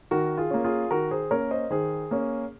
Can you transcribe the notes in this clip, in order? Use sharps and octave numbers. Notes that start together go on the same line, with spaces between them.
D#3 F#4 A#4
F4 G#4
A#3 C#4
F4 G#4
D#3 F#4 A#4
G#4 C5
A#3 C#4 A#4 C#5
C5 D#5
D#3 G#4 C5
A#3 C#4